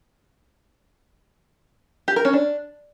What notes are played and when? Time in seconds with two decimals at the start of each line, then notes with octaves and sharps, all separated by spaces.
2.08 G4
2.16 A#4
2.25 C#4
2.33 D4